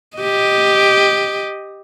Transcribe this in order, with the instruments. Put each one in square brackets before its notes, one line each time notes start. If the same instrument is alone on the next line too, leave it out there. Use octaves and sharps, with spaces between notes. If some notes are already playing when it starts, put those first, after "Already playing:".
[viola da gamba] G4 D#5